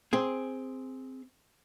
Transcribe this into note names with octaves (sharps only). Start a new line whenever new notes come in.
C4 G#4